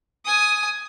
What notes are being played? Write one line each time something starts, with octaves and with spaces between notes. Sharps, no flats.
G#5 D#6